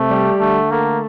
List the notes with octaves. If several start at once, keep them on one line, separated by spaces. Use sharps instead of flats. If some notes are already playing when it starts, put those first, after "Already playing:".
Already playing: C3 A3
G3
D3 A3
A3 A#3